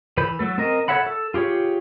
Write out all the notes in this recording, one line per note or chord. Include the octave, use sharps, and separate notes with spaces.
E3 B4 B5 G6
F#3 A3 A4
C4 A#4 D#5
A4 C#5 E5 F#5 B5
A4
F4 G4 G#4 C#5